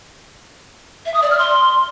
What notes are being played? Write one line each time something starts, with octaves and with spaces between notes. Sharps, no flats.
E5
D#6
D5
F6
C6